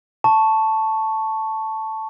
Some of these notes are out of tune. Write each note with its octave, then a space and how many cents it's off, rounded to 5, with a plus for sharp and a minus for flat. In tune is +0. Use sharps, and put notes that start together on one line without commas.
A5 +0 C#6 +0